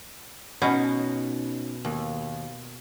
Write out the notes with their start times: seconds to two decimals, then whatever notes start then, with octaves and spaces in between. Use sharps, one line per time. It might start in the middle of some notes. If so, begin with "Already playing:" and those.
0.62 B2 C#4 D#4
1.85 D#2